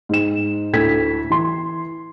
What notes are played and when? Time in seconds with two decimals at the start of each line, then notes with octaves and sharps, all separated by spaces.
0.09 G#2 E7
0.73 D2 A2 A4 G#6 B6
1.30 E3 C6